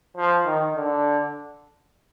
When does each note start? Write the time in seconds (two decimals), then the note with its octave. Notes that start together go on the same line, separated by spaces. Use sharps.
0.16 F3
0.45 D#3
0.76 D3